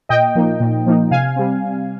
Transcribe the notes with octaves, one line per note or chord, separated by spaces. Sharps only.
A#2 D#5 G5
F3 A#3 D#4
A#2
F3 A#3 D#4
C3 F5 G#5
G3 C4